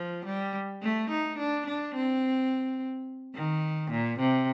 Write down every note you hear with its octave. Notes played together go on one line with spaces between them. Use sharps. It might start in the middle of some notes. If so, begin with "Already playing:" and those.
Already playing: F3
G3
A3
D#4
D4
D4
C4
D#3
A#2
C3